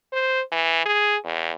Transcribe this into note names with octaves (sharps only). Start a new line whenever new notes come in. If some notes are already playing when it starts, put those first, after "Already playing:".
C5
E3
G#4
E2